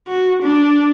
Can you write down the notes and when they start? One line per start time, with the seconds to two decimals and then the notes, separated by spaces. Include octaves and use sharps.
0.08 F#4
0.43 D4